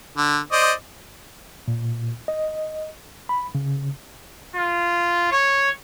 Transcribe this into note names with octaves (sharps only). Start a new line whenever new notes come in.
D3
C5 D5 D#5
A#2
D#5
B5
C#3
F4
C#5